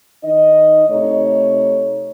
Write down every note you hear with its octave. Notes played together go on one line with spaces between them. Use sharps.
D#3 D#4 D#5
C3 A3 D#4 C#5